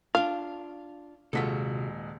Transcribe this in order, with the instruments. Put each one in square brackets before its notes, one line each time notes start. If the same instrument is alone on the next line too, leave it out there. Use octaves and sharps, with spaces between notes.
[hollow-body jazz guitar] D4 F4 [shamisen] F5
[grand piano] D#1 G#3 B6 [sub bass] C3 [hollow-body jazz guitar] F4 F#4 A4